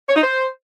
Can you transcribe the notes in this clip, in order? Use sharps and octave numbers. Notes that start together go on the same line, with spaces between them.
C#5
D#4
C5